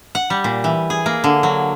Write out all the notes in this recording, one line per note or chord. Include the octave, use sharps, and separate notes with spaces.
F#5
G3
A#2
E3
G#4
A#3
D3
F#3